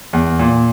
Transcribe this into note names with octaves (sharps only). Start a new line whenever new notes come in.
E2
A#2